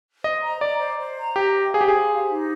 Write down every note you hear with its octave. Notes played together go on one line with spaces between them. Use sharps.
C5 D#5
A#5
D5 D#5
C5
C5
A#5
G4 D#5
C5
G#4 F5
G4
G#4 C5
G4
D#4